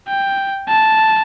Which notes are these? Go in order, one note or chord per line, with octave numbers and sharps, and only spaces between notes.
G5
A5